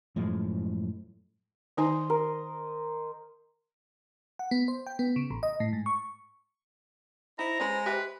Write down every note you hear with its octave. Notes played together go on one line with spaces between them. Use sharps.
F#2 A2 F3 G#3
D#3 D#4 C5 D#5 G#5
A#4
F#5
B3
C5
G5
B3
C#3
A1
D#5
A2
G#2
C#6
D#4 E4 C5 A#5
G#3 C#4 B4
G4 B4 E5 G5